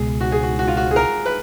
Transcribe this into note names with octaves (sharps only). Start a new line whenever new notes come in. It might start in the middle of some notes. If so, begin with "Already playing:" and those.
Already playing: C#2 B2 G#3 G#4
F#4
G#4
F#4
F#4
F4
F#4
G#4
A#4
B4